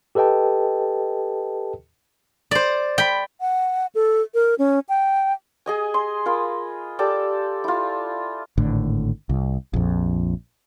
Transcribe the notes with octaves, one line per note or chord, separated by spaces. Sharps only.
G4 A4 B4 D#5 G5 A5
C5 D5
G5 B5
F#5
A4
A#4
C#4
G5
G#4 D#5 G#5
C6
F4 A#4 B5
G4 A4 D5
E4 F4
G#1 A2 D3
C2
A#1 F2